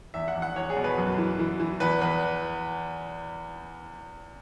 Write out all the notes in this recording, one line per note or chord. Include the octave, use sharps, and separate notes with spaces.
E2 E5
F#5
E2
F#5
E2 C#5
G#4
B2
B4
F#2
E3
E3
E3
E2 B4
E2 B4